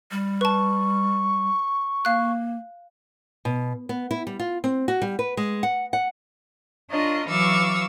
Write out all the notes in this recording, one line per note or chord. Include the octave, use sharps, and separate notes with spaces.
G3
B4 A5 C#6
A#3 F5 F#6
B2
B3
E4
G3
F4
C4
F#4
G3
B4
G#3
F#5
F#5
D4 F4 A#4 C#5 D#5
E3 F#3 F5 C#6 D6 E6